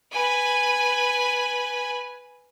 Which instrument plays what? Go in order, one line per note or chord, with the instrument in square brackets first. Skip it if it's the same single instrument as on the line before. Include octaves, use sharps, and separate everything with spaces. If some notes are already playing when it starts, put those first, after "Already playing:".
[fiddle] B4 G#5